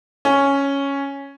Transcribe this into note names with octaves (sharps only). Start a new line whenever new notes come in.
C#4